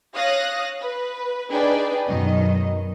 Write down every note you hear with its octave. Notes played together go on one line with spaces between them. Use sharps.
C#5 F5 D#6 F#6 A#6
B4
D4 D#4 G#4 B4 D5 G5
F#2 B2 D#3 F#3 D#5